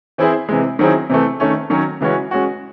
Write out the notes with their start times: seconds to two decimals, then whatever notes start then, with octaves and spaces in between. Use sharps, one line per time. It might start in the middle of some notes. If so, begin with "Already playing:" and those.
0.18 E3 C4 E4 G#4 C5
0.49 C3 E3 G#3
0.79 D#3 F#3 C4 E4 G#4
1.10 C3 E3 A3
1.40 D#3 A3 C#4
1.70 D#3 F#3 C#4
2.01 C#3 E3 G#3 C#4 F#4
2.31 G#3 C#4 F#4